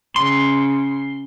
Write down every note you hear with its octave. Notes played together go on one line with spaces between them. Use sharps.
C#3 C6